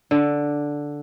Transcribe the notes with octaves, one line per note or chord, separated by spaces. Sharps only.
D3